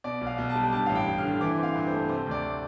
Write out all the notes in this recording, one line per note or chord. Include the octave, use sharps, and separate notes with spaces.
B2 D5
B1
F5
B1
A5
G3
G2 A5
A1 F5
G5
A1
F6
D3
E3 D6
C4 F5
G2
C5
A3
C3 C5
D2 D5